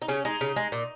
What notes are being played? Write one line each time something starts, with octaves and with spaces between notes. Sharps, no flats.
D#4
C#3 C#4
G#3 D#4
C#3
G#3
A#2